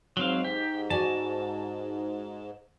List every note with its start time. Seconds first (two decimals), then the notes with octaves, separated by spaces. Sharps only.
0.17 G#2 F#3 C4 F5
0.44 G4
0.90 F#4 D5 G#5 A5